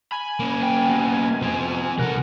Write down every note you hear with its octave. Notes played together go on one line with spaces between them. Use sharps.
G#5 B5
A#3 C#4
D2 G5
C3 B3
F3 C4
C2 A4 A#4 F#5